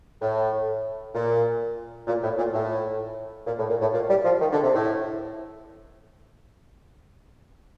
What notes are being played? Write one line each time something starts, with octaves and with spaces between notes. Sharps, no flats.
A2
A#2
A#2
A2
A#2
A2
A#2
A2
A#2
A2
A#2
G3
F3
D#3
D3
C3
A2